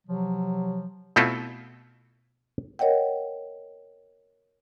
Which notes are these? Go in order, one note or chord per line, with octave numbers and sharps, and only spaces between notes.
C3 F3 F#3
B2 A3 C4 E4 F4 A4
A#4 C#5 D#5 F#5 G5